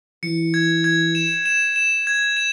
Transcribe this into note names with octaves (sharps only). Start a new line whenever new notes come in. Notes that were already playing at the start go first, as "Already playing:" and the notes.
E3 C#7
G#6
G#6
E7
E7
E7
G#6
E7